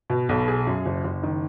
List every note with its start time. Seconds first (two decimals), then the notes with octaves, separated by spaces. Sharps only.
0.10 B2
0.29 B1
0.48 G#4
0.67 F#2
0.86 F#1
1.04 F#1
1.23 D#3